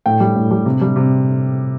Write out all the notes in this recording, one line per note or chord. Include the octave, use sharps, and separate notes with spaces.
A2 G5
G3
A2
G3
C3
G3
C3